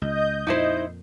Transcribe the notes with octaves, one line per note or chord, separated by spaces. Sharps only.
C#2 D#5 G6
F2 A#2 D#4 E4 C5